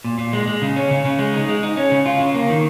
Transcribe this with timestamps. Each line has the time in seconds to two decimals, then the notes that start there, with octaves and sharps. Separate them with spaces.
0.04 A#2
0.18 A#2
0.33 G#3
0.47 G#3
0.62 C#3
0.76 C#4
0.91 C#3
1.05 C#3
1.19 G#3
1.34 D#4
1.49 G#3
1.63 D#4
1.77 C#4
1.91 C#3
2.06 F4
2.20 C#3
2.35 A#3
2.50 D#3